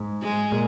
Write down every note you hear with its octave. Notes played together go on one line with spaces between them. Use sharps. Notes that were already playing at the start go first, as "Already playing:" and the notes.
Already playing: G#2
G#3
A#2